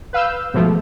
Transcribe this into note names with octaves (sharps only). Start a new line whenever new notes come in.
B4 F5 E6 G6
G#2 B2 E3 F3 A3